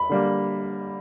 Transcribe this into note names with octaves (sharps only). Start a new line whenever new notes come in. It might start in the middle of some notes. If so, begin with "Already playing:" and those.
Already playing: B5
D3 G3 A#3